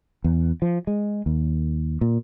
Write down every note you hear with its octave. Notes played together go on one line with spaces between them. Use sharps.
E2
F3
G#3
D#2
A#2